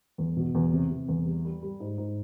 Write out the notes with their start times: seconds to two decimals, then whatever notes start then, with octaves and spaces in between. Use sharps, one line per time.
0.18 E2
0.37 B2
0.55 E2
0.73 C3
0.90 C3
1.08 E2
1.26 G3
1.45 G3
1.62 G3
1.80 G#2
1.98 G#2